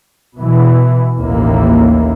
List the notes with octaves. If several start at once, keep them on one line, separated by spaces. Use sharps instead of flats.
B2 E3
A1 D#2 E3 A#3